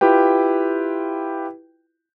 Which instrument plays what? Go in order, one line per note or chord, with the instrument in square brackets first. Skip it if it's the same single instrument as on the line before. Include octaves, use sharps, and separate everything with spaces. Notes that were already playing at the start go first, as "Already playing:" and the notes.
[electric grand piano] E4 F4 G4 B4 G5